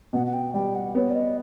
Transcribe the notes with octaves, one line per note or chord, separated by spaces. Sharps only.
B2 F#5
F#5
G5
G3 G5
F#5
B3 C#5
D5
D#5